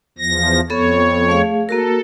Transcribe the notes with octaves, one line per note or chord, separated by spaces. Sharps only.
E2 F3 A#6
F2 B3 A4 C#5
A3 G#4 F5
A#3 F#4 A4 A#4